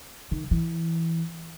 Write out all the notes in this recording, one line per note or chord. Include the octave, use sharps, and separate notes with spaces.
D#3
E3